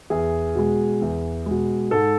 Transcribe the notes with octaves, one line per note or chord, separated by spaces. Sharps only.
E2 G#4
B2 G#3
E2
B2 G#3
G#2 A4